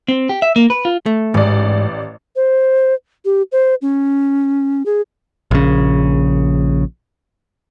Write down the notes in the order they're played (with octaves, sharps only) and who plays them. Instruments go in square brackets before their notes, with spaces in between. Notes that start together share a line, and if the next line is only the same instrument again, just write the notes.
[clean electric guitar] C4
G4
E5
A#3
B4
F4
[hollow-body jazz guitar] A3
[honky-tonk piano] A1 D5 [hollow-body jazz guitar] G#2
[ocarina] C5
G4
C5
C#4
G#4
[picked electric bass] A#1 C#3